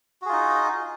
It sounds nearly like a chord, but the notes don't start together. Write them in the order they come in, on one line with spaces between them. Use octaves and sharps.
F#4 G#4 F4 D#4